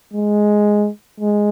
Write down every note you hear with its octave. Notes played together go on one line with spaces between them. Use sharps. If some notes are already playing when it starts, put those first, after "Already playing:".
G#3
G#3